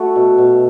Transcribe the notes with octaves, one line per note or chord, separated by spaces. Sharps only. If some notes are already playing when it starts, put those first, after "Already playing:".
Already playing: A3 F#4 A4
B2
B2